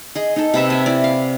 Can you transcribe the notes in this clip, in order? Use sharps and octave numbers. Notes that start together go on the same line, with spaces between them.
G#4 D#5
D#4 A4
C3 B4 E5 A5
E5 G#5
E4 D5
F5